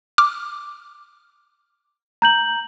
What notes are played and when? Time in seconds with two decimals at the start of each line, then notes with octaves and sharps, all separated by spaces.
0.18 D6 F6
2.22 A#5 G6 F#7